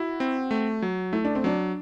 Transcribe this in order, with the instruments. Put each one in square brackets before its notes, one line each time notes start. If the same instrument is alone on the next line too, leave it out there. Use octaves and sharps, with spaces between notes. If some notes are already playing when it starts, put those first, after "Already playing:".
Already playing: [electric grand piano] E4 [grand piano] F#4
[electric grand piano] C4
A3
F#3
[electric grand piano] A3 [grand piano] E4
[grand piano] D4
C4
[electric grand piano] F#3 [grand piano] D4